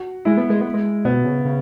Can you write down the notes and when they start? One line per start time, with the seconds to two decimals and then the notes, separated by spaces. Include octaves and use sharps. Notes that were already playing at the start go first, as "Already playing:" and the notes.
Already playing: F#4
0.25 G#3 E4
0.37 B3
0.50 G#3
0.61 B3
0.74 G#3
1.05 B2 B3
1.25 C#3
1.45 C#3